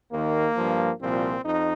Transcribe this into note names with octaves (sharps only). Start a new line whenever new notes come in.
D#2 D#3 A#3
G2 F3
C2 A#2 F3 C4
F2 D#4